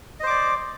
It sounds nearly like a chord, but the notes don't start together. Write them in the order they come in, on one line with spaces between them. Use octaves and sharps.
D#5 C5 D6 D5